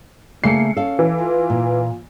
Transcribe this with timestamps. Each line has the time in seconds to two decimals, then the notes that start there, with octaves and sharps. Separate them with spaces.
0.44 C#3 A3 A#3 C7 C#7
0.77 C#4 A4 F5
0.99 E3
1.20 F4
1.50 A#2